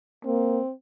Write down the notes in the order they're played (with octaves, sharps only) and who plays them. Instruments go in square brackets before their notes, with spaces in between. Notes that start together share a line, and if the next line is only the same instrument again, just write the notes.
[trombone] A#3 [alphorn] C4